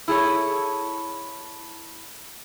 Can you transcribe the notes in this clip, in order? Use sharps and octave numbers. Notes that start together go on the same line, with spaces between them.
E4 G#4 A4 C#5